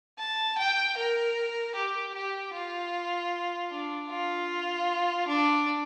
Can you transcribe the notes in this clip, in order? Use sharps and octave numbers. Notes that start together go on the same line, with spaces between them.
A5
G5
A#4
G4
G4
F4
D4
F4
D4